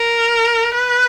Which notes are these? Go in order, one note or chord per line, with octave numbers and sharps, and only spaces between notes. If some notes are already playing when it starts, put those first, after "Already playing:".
Already playing: A#4
B4